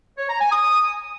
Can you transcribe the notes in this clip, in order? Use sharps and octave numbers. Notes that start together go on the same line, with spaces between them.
C#5
A#5
G#5
D#6